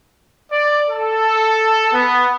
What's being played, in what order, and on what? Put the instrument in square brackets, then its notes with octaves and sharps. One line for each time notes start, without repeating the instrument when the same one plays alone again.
[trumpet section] D5
A4
B3